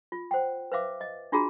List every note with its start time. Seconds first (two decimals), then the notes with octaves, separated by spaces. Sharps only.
0.12 F4
0.31 C5 F#5 G5
0.72 B4 C5 E5 F5 D6
1.01 D#5
1.32 D4 F4 F#4 G#4 A#5 B5